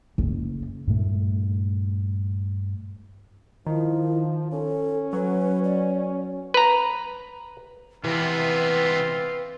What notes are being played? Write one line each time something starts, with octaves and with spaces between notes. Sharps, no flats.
F#1
G2 A#2 A3
D#3 F3 E4
C#4 A4
F#3 B4
D5
B4 A#5
C3 E3 B3 C4 F4 B4